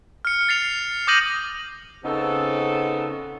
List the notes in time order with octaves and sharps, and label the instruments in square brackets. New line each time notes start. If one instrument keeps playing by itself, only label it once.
[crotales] F6 C#7
A6 C7 F7
D6 D#6 G6 A#6 D#7 F#7
[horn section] C#3 B3 C4 D#4 A4